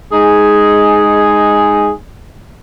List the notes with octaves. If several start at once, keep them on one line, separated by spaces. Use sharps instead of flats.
G#3 D#4 G#4